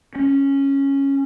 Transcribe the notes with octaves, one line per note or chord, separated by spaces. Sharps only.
C#4